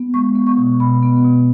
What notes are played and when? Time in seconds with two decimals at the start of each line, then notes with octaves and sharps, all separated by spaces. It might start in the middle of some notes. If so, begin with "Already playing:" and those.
Already playing: B3
0.14 G#3 C#6
0.36 B3
0.47 C#6
0.57 B2
0.80 B2 B5
1.03 B3
1.25 B2